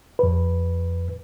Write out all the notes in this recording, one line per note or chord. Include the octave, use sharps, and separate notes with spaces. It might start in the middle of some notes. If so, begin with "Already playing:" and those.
F2 B4